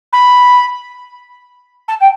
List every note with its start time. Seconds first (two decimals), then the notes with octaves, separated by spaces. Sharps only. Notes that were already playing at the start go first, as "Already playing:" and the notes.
0.12 B5
1.88 A5
2.00 G5